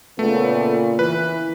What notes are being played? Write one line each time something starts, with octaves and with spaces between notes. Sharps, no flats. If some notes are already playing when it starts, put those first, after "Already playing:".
A#2 C#3 A3 B3
E3 B4